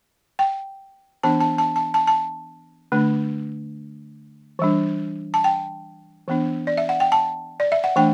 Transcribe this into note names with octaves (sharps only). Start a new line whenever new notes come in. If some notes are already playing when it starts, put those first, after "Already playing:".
G5
E3 B3 D4 A5
A5
A5
A5
A5
A5
D3 A3 D4
E3 G3 D4
A5
G5
E3 B3 D4
D5
E5
F#5
G5
A5
D5
E5
F#5
E3 A3 D4 G5